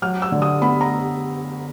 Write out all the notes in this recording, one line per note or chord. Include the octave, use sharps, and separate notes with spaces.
F#3 F6
E6
D3
D#6
B3 B5
A#5